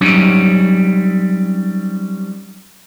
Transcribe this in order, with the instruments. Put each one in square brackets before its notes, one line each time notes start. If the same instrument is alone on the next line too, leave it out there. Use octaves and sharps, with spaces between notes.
[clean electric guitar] F#3 G3 C4 C#4 D#4